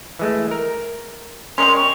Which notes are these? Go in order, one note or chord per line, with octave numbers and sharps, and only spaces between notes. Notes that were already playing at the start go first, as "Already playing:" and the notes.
E3 G#3 A3
A#4
G3 G#3 C#4 A#4 C6 F7
C#6